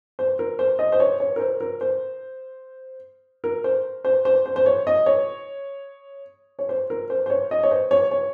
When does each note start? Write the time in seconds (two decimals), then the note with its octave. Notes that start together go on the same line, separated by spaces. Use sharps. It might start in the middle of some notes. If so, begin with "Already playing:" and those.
0.19 C5
0.39 A#4
0.59 C5
0.79 D#5
0.92 C5
1.00 C#5
1.20 C#5
1.36 A#4
1.40 C5
1.60 A#4
1.81 C5
3.44 A#4
3.64 C5
4.05 C5
4.25 C5
4.46 C5
4.56 C5
4.66 C#5
4.87 D#5
5.06 C#5
6.59 C#5
6.69 C5
6.90 A#4
7.10 C5
7.26 C5
7.30 C#5
7.51 D#5
7.63 C#5
7.71 C5
7.91 C#5
8.11 C#5